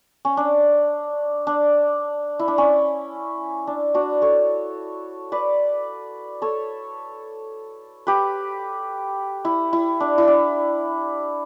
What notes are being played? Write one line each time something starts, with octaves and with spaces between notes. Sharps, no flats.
C#4
D4
D4
E4
D4
C#4
D4
D4 F#4
A4 C#5
B4 D5
A4 C#5
G4 B4
E4
E4
D4
E4
D4